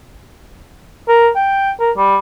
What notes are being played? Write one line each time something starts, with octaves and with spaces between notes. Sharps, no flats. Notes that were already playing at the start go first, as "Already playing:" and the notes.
A#4
G5
A#4
G3